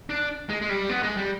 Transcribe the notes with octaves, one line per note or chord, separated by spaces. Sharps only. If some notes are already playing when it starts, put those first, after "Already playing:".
D4
G#3
G#3
G3
B3
G#3
G3